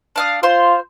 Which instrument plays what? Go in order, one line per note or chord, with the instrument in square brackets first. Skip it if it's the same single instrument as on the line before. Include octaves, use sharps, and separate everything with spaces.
[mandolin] D4 F5 D#6
[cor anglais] F4 [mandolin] C5 C6